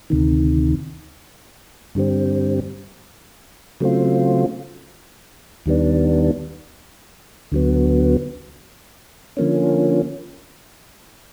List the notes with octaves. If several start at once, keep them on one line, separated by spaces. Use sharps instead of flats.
D2 C3 D#3
G2 D3 G3 C4
C#3 F#3 A3 C4 F4
D#2 D#3 G3 B3 D4
D2 D3 F#3 B3
D3 F3 A#3 C#4